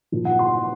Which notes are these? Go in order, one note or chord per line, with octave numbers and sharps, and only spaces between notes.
A#2 F3
F#5
C6